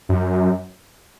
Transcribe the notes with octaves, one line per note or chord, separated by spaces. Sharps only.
F#2